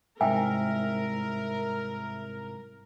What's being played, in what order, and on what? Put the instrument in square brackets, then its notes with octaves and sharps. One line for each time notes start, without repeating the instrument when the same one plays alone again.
[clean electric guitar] C2 G#2 [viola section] A#4 [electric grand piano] E5 [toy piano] G5 G#5